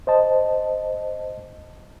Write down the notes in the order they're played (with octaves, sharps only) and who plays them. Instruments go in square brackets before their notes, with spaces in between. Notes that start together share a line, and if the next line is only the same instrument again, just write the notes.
[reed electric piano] C5 D#5 A5